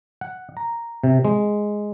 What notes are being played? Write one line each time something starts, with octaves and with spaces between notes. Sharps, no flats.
F#5
A#5
C3
G#3